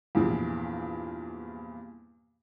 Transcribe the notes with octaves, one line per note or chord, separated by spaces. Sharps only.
E2 G2 A#2 E3 F3